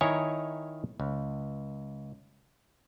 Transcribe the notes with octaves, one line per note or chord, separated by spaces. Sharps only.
D#3 E4 C#5 D#5 G#5 A#5
C#2